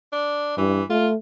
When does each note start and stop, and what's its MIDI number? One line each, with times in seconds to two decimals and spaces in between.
0.13 0.58 62
0.58 0.82 43
0.58 0.84 52
0.90 1.16 57
0.90 1.08 65